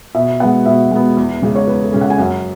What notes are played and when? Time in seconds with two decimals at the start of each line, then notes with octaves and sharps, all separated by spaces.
0.15 B2 E5
0.40 G#3 B3 F#5
0.66 B2 E5
0.91 G#3 B3
1.17 E2
1.42 C#3 G#3 C#4
1.56 C#5
1.67 E2 B4
1.84 A4
1.93 C#3 G#3 C#4
2.01 F#5
2.10 G#5
2.18 F#2 F#5